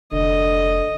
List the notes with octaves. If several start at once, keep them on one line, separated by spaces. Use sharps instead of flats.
F1 D3 D#5